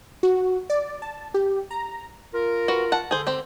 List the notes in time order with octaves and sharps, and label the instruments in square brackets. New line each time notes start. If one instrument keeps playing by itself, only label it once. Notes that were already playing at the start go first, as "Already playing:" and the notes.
[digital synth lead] F#4
D5
A5
G4
A#5
[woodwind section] F4 A#4
[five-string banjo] F#4 B4
F#5 A5
[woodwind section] D3 [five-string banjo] G#4 C5
[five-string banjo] C4 G4